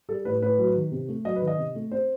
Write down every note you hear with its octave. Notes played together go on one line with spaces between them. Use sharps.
G3 A4
A2 B4
A2 B4
F#3
D#3
C3
A3
F#3 D#5
B4
D#3
D#5
C3
A3
C4 C5